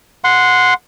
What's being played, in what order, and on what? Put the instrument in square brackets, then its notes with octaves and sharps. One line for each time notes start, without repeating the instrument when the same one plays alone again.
[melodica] F#5 C6